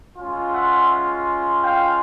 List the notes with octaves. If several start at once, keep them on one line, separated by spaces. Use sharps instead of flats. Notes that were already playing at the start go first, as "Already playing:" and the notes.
G#3 C#4 F4
E5 F#5
F5 G5